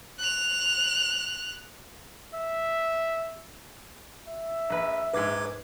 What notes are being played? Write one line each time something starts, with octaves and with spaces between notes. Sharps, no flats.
F#6 F7
E5
E5
A#1 B4
A#1 G#2 B4 D6 G#6